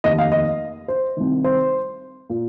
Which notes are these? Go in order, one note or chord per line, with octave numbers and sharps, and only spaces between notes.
F1 D#2 D#3 D#5
F5
D#5
C5
C2 C3 D#3
C5
A#2